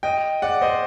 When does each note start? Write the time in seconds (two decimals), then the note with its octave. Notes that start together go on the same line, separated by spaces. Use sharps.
0.03 D#5 G5
0.42 D5 F#5
0.61 C5 D#5